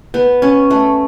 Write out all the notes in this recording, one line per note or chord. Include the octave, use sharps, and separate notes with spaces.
B3
C#4
A3